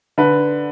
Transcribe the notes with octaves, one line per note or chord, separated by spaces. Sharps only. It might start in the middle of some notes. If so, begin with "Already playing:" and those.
D3 B4